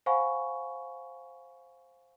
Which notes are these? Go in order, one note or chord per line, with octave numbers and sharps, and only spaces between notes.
C5 F5 F#5 G#5 B5 C#6